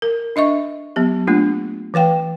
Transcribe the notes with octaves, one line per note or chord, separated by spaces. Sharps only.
A#4
D4 D#5 E5 C#6
F#3 B3 G4
A3 A#3 D4 F4
E3 B4 F5 G5